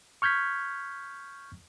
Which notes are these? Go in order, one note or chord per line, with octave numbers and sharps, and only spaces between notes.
C#6 F6 G6 G#6 B6